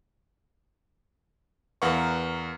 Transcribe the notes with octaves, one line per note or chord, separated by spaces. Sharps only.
E2 A#4 B4 F5 F#5 C#6